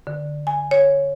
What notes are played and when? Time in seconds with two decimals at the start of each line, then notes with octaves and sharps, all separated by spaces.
0.07 D3
0.47 G#5
0.71 C#5